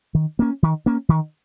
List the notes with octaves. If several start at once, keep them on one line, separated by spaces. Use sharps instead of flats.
D#3
A#3 C#4
D#3
A#3 C#4
D#3